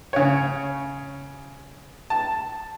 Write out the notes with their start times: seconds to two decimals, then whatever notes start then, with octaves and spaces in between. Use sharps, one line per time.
0.13 C#3 C#5
2.10 A5